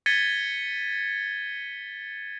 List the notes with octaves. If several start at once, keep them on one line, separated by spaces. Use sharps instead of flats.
G#6 A6 B6 C#7 D#7 G7